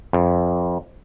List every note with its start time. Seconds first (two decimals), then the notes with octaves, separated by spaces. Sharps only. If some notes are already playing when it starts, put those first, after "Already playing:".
0.13 F2